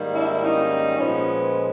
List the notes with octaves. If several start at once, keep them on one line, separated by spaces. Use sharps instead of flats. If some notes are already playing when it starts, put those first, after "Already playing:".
Already playing: G#2 D#3 G3 A#3
D4 E4
C#4 D#4
A#2 F3 G#3 B3 C#4